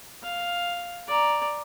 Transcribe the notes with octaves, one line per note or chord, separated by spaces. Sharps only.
F5
D5 A#5